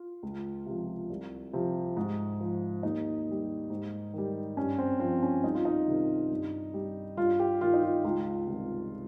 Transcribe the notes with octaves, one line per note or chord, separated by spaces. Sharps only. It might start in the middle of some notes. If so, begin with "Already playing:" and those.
Already playing: F4
C#2
C3 F3
C2
C3 F3
G#2
F3
D#2 D#4
D#3 G3
G#2
D#3 G3
G2 C#4
C4
F3 C4
C#4
C2 D#4
F4
D#4
C3 D#3 G3
G2
G3
G2 F4
G4
D#3 G3 F4
D#4
F4
C#2 F4
C3 D#3 G3